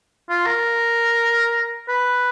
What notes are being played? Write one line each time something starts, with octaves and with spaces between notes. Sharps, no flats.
F4
A#4
B4